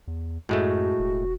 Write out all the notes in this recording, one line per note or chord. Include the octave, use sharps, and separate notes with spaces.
E2
F#2 A2 G#3 A3 F#4
E1